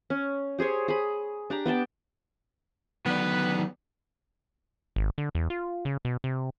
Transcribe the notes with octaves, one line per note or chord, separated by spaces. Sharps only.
C#4
G4 G#4 C5 C#5
G#4 B5
D4 G4 A#5
B3 D5 G5 A5
D3 D#3 F#3 B3 B4 D5
G#1
D3
E2
F4
C#3
B2
C3